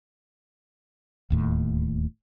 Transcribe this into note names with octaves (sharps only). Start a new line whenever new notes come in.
D1 D#2 A2